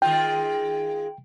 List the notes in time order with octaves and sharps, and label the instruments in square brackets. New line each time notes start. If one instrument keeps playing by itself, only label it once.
[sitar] D#3 G#3 F4 [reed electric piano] G5